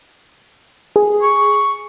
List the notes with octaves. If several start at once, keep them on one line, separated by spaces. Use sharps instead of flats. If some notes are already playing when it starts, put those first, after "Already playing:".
G#4
C#6